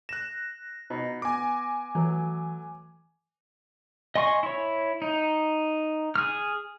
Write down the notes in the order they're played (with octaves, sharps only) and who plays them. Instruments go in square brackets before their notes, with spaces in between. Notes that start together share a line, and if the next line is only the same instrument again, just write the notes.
[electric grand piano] F#6 E7 [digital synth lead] A#6
[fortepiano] B2 D#4
[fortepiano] B3 [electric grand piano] G#5 D6
[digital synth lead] E3 [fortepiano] F#3 A3
[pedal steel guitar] D#5 G#5 C6 C#6
E4 C#5
D#4
G#4 D#6 F6